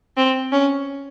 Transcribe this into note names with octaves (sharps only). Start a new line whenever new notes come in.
C4
C#4